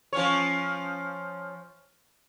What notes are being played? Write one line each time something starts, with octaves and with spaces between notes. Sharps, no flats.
F3 C#4 C#5